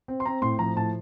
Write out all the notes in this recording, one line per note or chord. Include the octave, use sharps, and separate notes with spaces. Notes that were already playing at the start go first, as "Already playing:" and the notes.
C4
C6
C4 A#5
A2 C6
F3 A#5
A2 A5